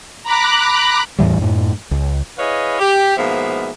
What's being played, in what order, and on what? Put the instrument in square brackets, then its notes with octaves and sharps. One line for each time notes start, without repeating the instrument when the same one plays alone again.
[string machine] A#5 B5 D6 F#6
[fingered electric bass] E2 A2 E3 G3
F#2 A2
C#2
[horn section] E4 G#4 B4 C#5 D#5 F5
G4
G#2 B2 F3 A#3 B3 E5